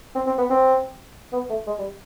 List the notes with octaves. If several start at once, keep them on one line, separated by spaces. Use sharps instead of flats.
C4
C4
B3
C4
B3
A3
G#3
G3